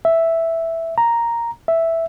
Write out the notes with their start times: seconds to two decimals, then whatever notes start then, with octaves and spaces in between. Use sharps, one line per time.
0.05 E5
0.98 A#5
1.68 E5